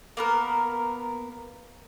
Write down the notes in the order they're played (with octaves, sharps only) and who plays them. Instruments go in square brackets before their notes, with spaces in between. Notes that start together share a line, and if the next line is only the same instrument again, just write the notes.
[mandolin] A#3 B3 A#4